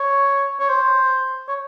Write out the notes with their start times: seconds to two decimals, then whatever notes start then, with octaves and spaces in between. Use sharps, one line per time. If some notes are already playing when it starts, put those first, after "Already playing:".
Already playing: C#5
0.60 C#5
0.69 C5
1.48 C#5